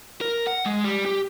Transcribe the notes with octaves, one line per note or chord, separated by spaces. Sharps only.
A#4
F#5
G#3
G3
G4